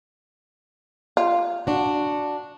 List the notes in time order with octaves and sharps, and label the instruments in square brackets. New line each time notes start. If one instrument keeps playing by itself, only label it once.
[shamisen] F4
[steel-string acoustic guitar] D4 F#4